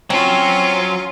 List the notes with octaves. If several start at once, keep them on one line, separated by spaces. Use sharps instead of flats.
F#3 C4 C#4 F4 F#4